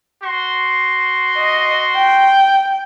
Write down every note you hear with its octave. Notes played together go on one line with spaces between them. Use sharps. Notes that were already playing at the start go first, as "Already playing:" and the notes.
F#4 C6
D#5
G5